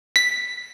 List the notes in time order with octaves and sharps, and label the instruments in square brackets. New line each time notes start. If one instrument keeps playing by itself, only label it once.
[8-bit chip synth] B6